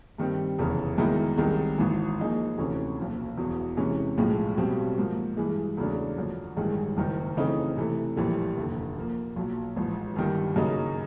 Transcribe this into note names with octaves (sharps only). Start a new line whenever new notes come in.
G2 D#3 G3 C4
F1 E2 C#3
F#2 D#3 G#3 B3 E4
C2 C3 D#3 G#3
G#1 G#2 E3
A#2 F3 A#3 D#4 G#4
D2 C3 E3 A3 C#4
B1 A#2 F3
E1 E2 B2
C3 E3 G#3 C#4
B1 A2 F3 G#3
B1 B2 G3 C4
G#2 F3 A#3
G2 E3 G#3
E2 C#3 F#3 A3 D4
F#2 D3 F3
A1 G2 D#3 G#3
F#1 F#2 D#3
C#3 E3 A3 C4 D#4
C3 E3 A3
A#1 A2 E3 G3 A#3
F1 D#2 D3
A#2 F3 A#3
B1 A#2 F#3
A1 G#2 F3
G1 G2 D#3 G3
F#2 C#3 F#3 A#3 D#4